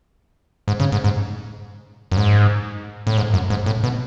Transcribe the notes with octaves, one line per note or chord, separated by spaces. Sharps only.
G#2
C#3
G#2
G#2
F#2
G#2
A2
G#2
F#2
G#2
A2
B2